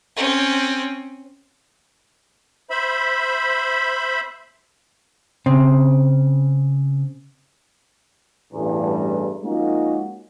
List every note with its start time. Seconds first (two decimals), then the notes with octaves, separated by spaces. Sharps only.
0.16 C4 C#4
2.70 C5 E5 B5
5.46 C#3 C4
8.53 A1 E2 G2
9.44 F3 G#3 A#3 C#4 D#4 F#4